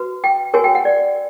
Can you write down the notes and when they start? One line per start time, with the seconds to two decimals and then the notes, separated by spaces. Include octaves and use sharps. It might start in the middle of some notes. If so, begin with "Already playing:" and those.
Already playing: F#4 B4
0.24 G5
0.54 F#4 A#4 C#5 G#5
0.64 G5
0.75 F#5
0.85 D5